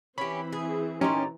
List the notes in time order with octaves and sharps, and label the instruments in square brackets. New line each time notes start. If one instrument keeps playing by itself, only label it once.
[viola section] E3 C4 [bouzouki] C#4 G4 [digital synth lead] B5
[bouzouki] G#4
[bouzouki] A#2 A#5 [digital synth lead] C#4 [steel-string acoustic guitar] D#4 G4